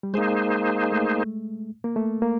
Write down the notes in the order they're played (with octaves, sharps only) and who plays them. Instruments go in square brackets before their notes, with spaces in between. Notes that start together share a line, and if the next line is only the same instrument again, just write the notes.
[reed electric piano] G3
[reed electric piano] G#3 [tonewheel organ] A#3 D#4 G#4 C5
[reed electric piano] A3
A#3
A3
A#3